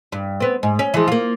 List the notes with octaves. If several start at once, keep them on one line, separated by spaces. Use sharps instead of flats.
G2
B3 C4
G#2
C#4
E3 F3 G#3
A#3 F4